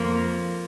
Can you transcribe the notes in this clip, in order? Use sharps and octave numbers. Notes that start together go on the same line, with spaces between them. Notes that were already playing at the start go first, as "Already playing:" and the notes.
Already playing: F2 F3 A#3